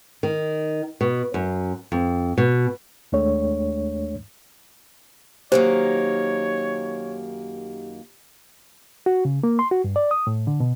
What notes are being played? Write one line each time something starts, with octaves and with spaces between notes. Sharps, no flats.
D#3
B2
F#2
F2
B2
D#2 G#3 A3 D4 C#5
F#2 D#3 A#3 G4 C5 C#5
F#4
C#3
A#3
C6
F#4
G2
D5
D#6
A2
D3
B2